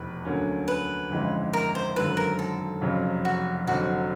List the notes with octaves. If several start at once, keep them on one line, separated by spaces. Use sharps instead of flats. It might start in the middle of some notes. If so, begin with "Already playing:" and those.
Already playing: F1 E2 B2 B4
D2 D3 F#3 A#3 C#4
B4
G1 F2 C#3 E3 G#3
A#4
C5
G#1 F#2 D3 F#3 B4
A#4
A4
F1 F2 C#3 F#3
F#4
F1 F2 D3 F#3 F#4